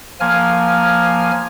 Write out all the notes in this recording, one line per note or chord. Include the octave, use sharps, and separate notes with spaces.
F3 A#3 G#5 F6